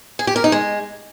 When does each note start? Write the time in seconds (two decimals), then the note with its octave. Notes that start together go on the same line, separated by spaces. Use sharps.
0.19 G#4
0.27 G4
0.36 A#4
0.44 D#4
0.52 G#3